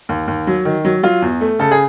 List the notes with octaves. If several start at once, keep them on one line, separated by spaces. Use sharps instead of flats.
D#2
D#2
F#3
D#3
F#3
F#3 F4
E2
A3
C#3 A4
G#4